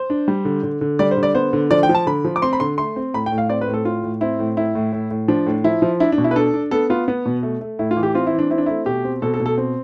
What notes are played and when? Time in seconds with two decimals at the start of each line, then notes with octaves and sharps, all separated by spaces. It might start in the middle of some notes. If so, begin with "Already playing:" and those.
Already playing: C5
0.10 D4
0.28 G3
0.45 D3
0.63 D3
0.81 D3
0.99 G3 D5
1.11 C5
1.17 D3
1.23 D5
1.35 B3 C5
1.53 D3
1.71 F3 D5
1.83 G5
1.89 F3
1.95 A5
2.06 D3 B5
2.25 F3
2.36 D6
2.42 C4 C6
2.53 B5
2.60 D3 C6
2.78 A3 C6
2.96 C4
3.14 A2 B5
3.26 G5
3.32 A2
3.38 F5
3.49 C4 D5
3.61 B4
3.68 A2
3.74 A4
3.85 A2 F4
4.03 A2
4.21 C4 E4
4.39 A2
4.57 A2 E4
4.75 A2
4.93 A2
5.11 A2
5.28 F3 D4
5.46 A2
5.64 F3 E4
5.82 F3
6.00 D4 E4
6.12 D4
6.18 B2
6.24 E4
6.31 B4
6.36 D4 A4
6.54 D4
6.71 B3 A4
6.90 B3 F4
7.08 B3
7.26 B2
7.43 A3
7.61 A3
7.79 A2 E4
7.91 F4
7.97 E3
8.03 G4
8.15 C4 F4
8.27 E4
8.33 E3
8.39 D4
8.50 C4 E4
8.58 D4
8.66 A3 E4
8.86 B2 G4
9.04 C4
9.22 B2 A4
9.34 A4
9.40 B2
9.46 A4
9.58 C4